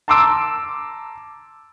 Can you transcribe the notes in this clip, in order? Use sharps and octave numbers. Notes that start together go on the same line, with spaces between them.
A5 A#5 C6 D6 E6 D7